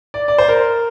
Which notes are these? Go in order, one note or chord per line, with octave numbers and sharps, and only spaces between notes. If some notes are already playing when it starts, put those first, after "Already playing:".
D5
D5
C5
A#4